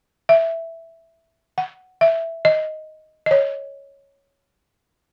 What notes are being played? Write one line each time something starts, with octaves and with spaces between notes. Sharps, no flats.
E5
F#5
E5
D#5
D#5
C#5